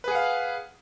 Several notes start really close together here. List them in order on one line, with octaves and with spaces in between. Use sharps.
B4 G#4 F#5 F5